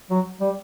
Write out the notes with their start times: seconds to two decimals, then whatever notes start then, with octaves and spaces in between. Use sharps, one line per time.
0.10 F#3
0.41 G3